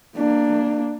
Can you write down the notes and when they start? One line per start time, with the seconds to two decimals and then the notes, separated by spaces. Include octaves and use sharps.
0.17 A#3 D4